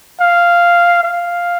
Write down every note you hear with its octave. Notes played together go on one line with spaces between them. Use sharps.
F5
F5